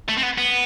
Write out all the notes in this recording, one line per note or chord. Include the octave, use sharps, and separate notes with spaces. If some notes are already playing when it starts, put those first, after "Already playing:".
A3
C4
B3
B3